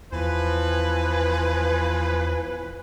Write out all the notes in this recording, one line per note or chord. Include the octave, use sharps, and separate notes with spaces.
E2 E3 F3 B4